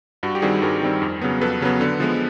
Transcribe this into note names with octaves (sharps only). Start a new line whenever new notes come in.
G2 F#4
G4
D#3 G3 C4 F#4 G#4
G2 G#4 A#4
D#3 G3 C4
F2
C#3 F#3 B3
F2 A4 B4
C#3 F#3 B3
D3
F3 G#3 B3